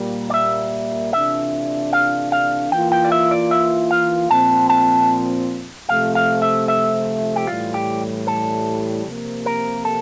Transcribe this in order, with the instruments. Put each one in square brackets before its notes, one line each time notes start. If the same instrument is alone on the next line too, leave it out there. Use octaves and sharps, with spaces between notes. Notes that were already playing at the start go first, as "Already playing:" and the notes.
Already playing: [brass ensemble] A#2 G3 A#3
[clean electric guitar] D5
E5
[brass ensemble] C3 E3 A3 D4 F4 [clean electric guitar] E5
[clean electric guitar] F5
F5
[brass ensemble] E3 A#3 F4 [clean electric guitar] G5
[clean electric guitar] G5
D5
E5
D5
E5
F5
[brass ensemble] A#2 F3 C4 [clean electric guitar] A5
[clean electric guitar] A5
[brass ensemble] C3 F3 A3 [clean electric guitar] F5
[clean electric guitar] F5
E5
E5
G4
[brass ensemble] A2 E3 G3 [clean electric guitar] F4
[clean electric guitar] G4
A4
[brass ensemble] C3 F3 A#3
[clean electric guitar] A#4
A4